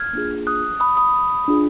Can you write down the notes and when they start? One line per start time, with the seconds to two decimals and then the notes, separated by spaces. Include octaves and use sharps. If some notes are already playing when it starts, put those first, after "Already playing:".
Already playing: F6 G#6
0.13 A#3 D4 F4 G#4
0.47 D#6 F#6
0.80 B5 D#6
0.97 B5 D#6
1.48 D4 F4 G#4